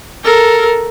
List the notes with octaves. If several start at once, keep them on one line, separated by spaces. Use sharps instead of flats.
A4 A#4